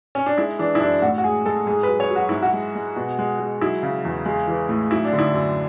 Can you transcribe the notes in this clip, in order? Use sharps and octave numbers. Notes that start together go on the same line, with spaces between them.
C#4
D4
G#3 E4
E3 D4
E4
F#2 D4
A2 F#4
F#4
G#3 G#4
G#3 A4
G#2 G#4
F#3 B4
C#5
F#3
F#4
G#2 E4
F#4
G#3
G#3
B2
G#3
G#3
F#3 E4
C#3
E2
G#3
E3
A2
F#3 E4
D4
D3
E4
F#2